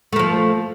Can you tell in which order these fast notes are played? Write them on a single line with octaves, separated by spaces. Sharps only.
A3 A#3 F3